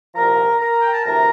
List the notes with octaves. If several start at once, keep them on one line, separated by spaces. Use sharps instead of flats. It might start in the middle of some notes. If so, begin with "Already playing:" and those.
C2 A#2 F3 A#4 A#5
A#4 A#5
G5
A5
D2 C3 E3 A#4 A#5